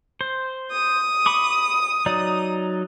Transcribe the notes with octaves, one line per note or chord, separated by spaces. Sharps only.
C5
D#6
B5 C#6 D6
F#3 D#4 D5